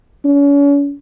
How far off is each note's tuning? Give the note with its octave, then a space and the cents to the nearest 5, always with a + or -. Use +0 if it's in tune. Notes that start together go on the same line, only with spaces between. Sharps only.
C#4 +40